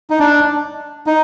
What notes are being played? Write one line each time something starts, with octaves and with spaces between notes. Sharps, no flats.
D#4
D4
D#4